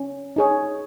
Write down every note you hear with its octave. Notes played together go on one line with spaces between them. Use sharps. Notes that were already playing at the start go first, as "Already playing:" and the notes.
Already playing: C#4
D#4 G#4 C#5